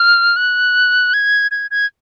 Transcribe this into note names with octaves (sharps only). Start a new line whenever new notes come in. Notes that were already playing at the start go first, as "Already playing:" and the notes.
Already playing: F6
F#6
G#6
G#6
G#6